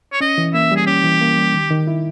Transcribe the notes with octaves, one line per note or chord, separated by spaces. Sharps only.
C#5
C#4 D#5
E3
A#3 E5
G3
G#4
C#4 G4
E3
A#3
G3
D#3
D#3
E4